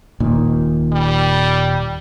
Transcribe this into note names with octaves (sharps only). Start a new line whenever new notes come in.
D#1 A#2 D#3
G3